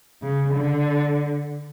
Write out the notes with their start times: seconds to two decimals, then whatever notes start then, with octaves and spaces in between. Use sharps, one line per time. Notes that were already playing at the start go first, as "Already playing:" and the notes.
0.22 C#3
0.54 D3